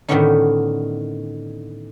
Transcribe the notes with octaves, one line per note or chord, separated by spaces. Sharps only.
A2 D3 D#3 B3 C#4 D#4